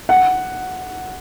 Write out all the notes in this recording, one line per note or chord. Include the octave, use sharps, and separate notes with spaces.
F#5